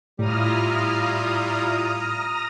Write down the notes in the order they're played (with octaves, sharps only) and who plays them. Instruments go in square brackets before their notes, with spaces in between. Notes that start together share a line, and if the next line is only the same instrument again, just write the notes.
[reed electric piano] A2 [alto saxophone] G3 [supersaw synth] E4 F4 [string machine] A#5 D#6 F6